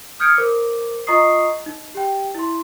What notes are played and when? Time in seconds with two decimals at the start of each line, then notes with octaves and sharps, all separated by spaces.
0.20 D#6 F6 G6 G#6 C#7 D7
0.37 A#4 C5 D6
1.07 F4 D#5 A#5 C#6 D#6 C7
1.66 D#4
1.95 G4 G5
2.35 E4 C6